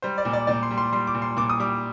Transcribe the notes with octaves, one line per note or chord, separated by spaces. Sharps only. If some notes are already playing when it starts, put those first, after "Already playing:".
G3 C5
D5
A#2
D5
A#2 D5
C6
G3
C6
G3 C6
D6
A#2
C6
A#2 D6
D#6
G3 D6